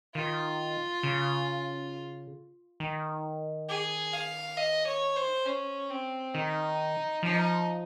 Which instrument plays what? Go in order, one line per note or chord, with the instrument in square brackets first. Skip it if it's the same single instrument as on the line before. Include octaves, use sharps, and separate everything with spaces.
[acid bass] D#3 [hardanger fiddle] F4
[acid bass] C#3
D#3
[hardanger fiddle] G#4
F5
D#5
C#5
C5
C#4
C4
[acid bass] D#3 [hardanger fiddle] D#4
[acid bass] F3 [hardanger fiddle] D#4